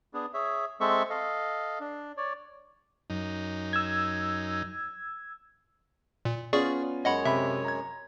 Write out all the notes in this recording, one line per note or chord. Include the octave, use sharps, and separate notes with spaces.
B3 D4 G#4
G#4 C#5 E5
G#3 C4 A4 E5 C#6
A4 D#5 F5
D4
C#5 D5
F#2 D#4
E6 G#6
A#2
B3 C#4 F4 G#4 D5 C#6
F#2 G#3 C#5 D#5 F#5 B5
C3 E5 B5
A#5 G#6